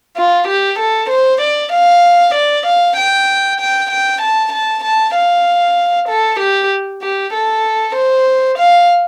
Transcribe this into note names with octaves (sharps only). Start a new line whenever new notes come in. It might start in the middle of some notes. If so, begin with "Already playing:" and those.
F4
G4
A4
C5
D5
F5
D5
F5
G5
G5
G5
A5
A5
A5
F5
A4
G4
G4
A4
C5
F5